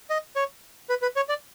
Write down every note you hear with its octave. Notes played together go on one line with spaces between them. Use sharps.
D#5
C#5
B4
B4
C#5
D5